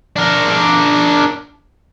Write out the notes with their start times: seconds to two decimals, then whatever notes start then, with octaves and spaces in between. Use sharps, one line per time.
0.16 D4 A#4